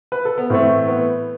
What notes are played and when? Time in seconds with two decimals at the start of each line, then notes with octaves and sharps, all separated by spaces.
0.12 B4
0.25 A4
0.38 B3
0.50 A2 E3 A3 C4
0.88 B3